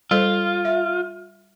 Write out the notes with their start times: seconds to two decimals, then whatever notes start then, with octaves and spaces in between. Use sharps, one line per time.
0.11 G3 F4 A4 C5
0.65 E5